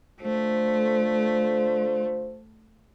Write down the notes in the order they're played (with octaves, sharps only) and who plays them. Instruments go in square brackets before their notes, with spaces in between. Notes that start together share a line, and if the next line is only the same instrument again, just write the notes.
[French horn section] D3 F4 C5 [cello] A3